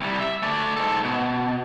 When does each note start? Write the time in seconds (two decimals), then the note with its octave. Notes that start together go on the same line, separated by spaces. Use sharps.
0.01 C2 G3
0.19 E5
0.43 A3 D5
0.76 G#2 A4
1.04 B2